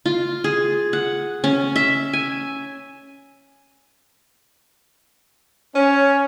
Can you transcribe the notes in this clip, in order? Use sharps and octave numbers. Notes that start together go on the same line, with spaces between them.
F4
G#4
F#5
C#4
E5
G#5
C#4